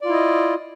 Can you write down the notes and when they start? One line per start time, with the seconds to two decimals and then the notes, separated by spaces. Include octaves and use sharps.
0.01 D5
0.05 F4
0.09 E4
0.13 D#5